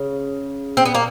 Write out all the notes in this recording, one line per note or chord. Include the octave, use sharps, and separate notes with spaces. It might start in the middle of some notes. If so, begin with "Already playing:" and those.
Already playing: C#3
C4
B3
A#3